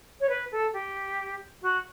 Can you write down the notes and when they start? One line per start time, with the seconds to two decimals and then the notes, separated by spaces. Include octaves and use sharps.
0.20 C#5
0.29 B4
0.52 A4
0.73 G4
1.62 F#4